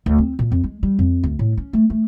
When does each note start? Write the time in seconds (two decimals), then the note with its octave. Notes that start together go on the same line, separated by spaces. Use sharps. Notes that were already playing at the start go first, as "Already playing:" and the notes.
0.06 D2
0.18 C4
0.39 A#2
0.52 F2
0.64 G#3
0.83 G3
0.99 F2
1.24 D2
1.39 A2
1.57 C#4
1.73 A3
1.90 A3